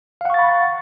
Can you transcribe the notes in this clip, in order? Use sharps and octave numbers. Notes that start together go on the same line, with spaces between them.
F5 F#5 B5 C#6 A6